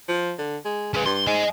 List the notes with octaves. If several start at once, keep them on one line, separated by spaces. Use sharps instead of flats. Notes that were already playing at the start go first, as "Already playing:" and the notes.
F3
D3
G#3
G#3 C#4 B4
G2 C6
G#2 D#5 G#5